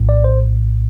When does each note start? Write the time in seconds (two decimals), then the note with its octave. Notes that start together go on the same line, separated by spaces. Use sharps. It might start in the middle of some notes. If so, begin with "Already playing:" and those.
Already playing: A#1 A2
0.09 D5
0.24 C5